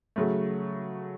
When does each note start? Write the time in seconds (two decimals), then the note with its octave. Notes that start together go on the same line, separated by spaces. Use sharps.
0.16 C#3 F#3 A3